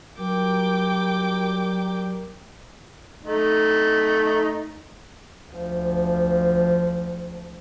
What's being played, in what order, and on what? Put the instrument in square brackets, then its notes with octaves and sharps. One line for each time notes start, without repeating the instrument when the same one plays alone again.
[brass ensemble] F#3 G3 A#4 [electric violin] G5 D6
[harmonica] A3 D#4
[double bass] D2 F3